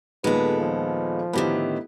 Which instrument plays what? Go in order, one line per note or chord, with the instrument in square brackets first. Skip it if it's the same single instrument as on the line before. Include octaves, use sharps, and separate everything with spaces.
[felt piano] D#2 A#2 B3 [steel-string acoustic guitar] G#3 A4 [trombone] B4
[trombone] F3
[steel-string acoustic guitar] A2 D3 D#3 [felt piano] B3 E4 G4